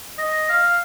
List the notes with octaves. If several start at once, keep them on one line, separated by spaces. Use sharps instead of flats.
D#5
F5